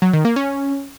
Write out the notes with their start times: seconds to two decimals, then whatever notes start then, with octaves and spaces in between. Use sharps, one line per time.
0.02 F#3
0.13 D#3
0.25 A#3
0.36 C#4